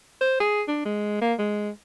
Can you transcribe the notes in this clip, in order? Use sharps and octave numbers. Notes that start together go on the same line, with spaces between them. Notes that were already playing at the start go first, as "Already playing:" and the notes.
C5
G#4
D4
G#3
A#3
G#3